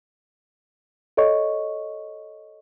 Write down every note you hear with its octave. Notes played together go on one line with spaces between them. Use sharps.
A4 C#5 D#5 C#6